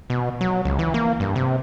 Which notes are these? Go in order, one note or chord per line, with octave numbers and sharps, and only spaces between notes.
B2
F#3
C#2
E3
A#3
G2
C3